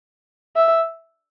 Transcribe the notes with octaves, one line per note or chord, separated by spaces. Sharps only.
E5